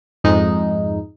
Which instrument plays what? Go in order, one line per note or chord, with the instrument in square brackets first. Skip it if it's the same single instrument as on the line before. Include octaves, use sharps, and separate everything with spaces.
[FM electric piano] F2 G#2 G#3 D#4